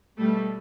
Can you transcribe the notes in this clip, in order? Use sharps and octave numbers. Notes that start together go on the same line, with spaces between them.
B2 G3 A3